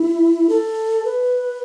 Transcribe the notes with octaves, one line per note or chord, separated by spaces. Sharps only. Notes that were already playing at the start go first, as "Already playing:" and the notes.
Already playing: E4
A4
B4